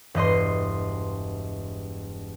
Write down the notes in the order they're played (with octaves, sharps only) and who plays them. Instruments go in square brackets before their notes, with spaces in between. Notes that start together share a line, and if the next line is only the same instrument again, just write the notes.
[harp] E1 G2 D#5 C6